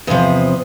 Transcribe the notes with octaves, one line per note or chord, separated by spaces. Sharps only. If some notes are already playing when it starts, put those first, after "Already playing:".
E2 C3 F3 D#5